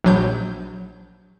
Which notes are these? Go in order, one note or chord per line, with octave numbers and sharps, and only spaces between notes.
A#1 F#3 G6